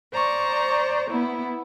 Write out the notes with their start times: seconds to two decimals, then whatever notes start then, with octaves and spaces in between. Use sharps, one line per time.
0.11 C5 D5 A#5 C#6
1.09 B3 E4